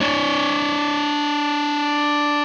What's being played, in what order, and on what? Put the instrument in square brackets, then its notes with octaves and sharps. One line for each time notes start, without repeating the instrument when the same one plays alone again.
[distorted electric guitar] D4 C#5